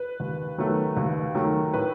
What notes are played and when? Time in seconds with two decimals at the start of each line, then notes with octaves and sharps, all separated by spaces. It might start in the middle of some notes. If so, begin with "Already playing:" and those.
Already playing: B4
0.20 D#2
0.58 D#3 F#3 A3
0.97 D#2
1.35 D#3 F#3 A3
1.73 A2 B4